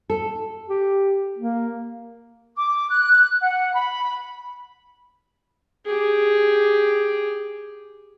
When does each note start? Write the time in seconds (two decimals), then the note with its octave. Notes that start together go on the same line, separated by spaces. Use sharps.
0.10 A4
0.69 G4
1.38 A#3
2.57 D6
2.89 F#6
3.41 F#5
3.74 B5
5.86 G4 G#4